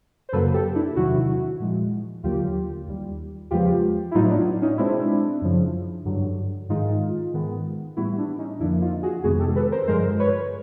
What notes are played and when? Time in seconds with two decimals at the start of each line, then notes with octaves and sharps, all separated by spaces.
0.29 C5
0.33 F#2 C#3 F#3 A#3 A4 B4
0.54 G4 A4
0.75 D4 E4
0.96 E2 C3 D#3 F#3 E4 F#4
1.60 A#2 F3 G#3
2.24 D#2 D3 F#3 A#3 F4 G4
2.87 D#2 D#3 G3
3.51 E2 C#3 F3 G#3 B3 F4 G4
4.11 E4
4.15 A2 F#3 B3 D#4 F4
4.30 D4 E4
4.62 C#4 D#4
4.78 B2 G#3 C4 D4 E4
5.41 F#2 C#3 F3
6.05 G2 D3 F#3
6.69 G#2 D#3 G#3 D#4 F4
7.34 G#2 D#3 G#3 B3
7.97 A2 E3 G3 B3 E4 F#4
8.18 D4 E4
8.39 C#4 D#4
8.60 F2 D3 F3 A#3 D4 E4
8.82 D#4 F4
9.03 F#4 G#4
9.24 F2 C3 D#3 G#3 B3 F#4 G#4
9.39 G4 A4
9.56 A4 B4
9.72 A#4 C5
9.87 G2 D3 F3 G#3 A#4 C5
10.19 B4 C#5